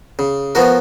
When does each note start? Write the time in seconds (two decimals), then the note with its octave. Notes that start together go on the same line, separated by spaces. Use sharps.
0.19 C#3
0.55 F3 B3 F#4 A#4